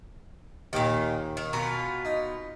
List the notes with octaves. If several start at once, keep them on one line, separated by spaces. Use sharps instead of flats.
D#2 A#2 D#3 G5 D6
D#3
B2 B3 F4 A#4 G#5 A#5
D#4